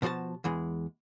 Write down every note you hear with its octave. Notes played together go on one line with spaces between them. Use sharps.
B2 F3 G#3 F#4 A5
E2 E3 G#3